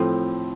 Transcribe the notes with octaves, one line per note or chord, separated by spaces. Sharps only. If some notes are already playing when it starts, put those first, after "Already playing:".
Already playing: A2 F3 C4